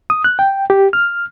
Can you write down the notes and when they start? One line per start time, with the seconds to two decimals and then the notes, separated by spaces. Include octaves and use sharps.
0.10 D#6
0.24 F#6
0.39 G5
0.70 G4
0.93 F6